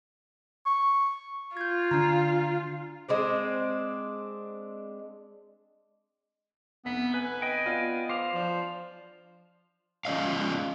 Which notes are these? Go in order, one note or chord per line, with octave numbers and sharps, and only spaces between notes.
C#6
F4 G6 G#6
D3 D4 A#5
G#3 C4 D4
F1 B3 B6
B4 G#5
B4 D#5 G5
B3 D4 F4
C5 F5 D6 C7
F3 D4 F4
F3 G#3 C#4 D5 D#5 F5